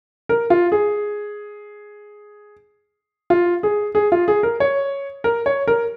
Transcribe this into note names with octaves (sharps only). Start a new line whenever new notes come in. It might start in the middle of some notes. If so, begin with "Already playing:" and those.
A#4
F4
G#4
F4
G#4
G#4
F4
G#4
A#4
C#5
A#4
C#5
A#4